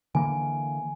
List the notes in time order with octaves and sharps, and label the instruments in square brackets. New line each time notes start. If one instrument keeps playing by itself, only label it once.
[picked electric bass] D3 E3 A#3 [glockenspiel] G#5